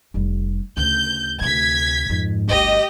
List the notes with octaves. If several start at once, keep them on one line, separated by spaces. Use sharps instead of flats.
F1 G3
D2 C#3 G6
D2 C3 G#6 B6
F2 G#2
G1 D2 G4 D#5